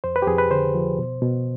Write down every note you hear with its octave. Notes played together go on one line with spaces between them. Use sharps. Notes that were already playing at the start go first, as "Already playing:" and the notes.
F2 C5
B4
G4
F2 G#4
B4
D3 C5
F3
B2
B2